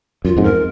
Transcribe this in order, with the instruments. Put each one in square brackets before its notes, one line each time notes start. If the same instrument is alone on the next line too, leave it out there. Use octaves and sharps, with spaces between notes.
[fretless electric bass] F#2 [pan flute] F4
[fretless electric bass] F2 G#2
[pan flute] A#4